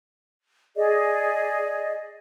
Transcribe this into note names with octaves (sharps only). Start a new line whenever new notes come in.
G#4 D5 D#5